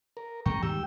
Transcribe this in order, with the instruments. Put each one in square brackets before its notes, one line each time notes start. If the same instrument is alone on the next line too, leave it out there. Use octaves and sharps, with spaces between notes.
[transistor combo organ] A#4
[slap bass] F2 G#3 [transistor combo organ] G5 A#5 C#6
[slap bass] D#2 G#2 G3 [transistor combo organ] G4 G5 E6